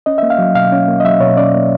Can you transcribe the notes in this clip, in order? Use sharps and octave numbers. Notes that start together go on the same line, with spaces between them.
C#4 D#5
A#3 E5
F5
F#3
B2 F5
C#4
A#3
D#5
F#3 E5
B2 C#5
C#4 D5
A#3